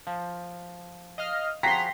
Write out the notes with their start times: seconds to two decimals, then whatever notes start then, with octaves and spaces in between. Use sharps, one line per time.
0.07 F3
1.18 D#5 F5 F6
1.63 F3 F#4 G#4 G5 A#5 C6 B6 C7